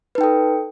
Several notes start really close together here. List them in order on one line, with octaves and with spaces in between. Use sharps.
B4 D#4 G5 A4